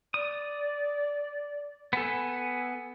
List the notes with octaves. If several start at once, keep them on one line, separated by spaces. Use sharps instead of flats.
D5 D#6
B3 A4 G#5